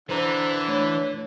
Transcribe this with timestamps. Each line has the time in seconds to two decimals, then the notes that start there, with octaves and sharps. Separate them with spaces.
0.09 D3 E3 B4 C5 A#5
0.68 A3 D4 C#5